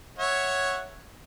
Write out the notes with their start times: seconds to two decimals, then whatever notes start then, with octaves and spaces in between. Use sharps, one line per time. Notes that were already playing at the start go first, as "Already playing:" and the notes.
0.19 C#5 E5 F#5